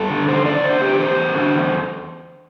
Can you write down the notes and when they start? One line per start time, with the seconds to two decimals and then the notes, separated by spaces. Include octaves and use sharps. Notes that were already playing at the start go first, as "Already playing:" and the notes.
Already playing: G2 A4
0.10 D3
0.28 E2 C5
0.45 E2 D5
0.63 D3 C5
0.81 D3 G4
0.99 E2 C5
1.17 E2
1.35 D3
1.52 E2